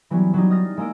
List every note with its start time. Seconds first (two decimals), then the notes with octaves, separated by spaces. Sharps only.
0.10 E3 F#3 G3 B3 C#4
0.34 F#3 G3 D#4
0.50 D#5 D#6 F6 A6 A#6
0.77 G#3 A#3 D#5 E6 D7